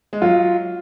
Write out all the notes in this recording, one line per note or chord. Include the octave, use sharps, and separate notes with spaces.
G#3
F#3 F4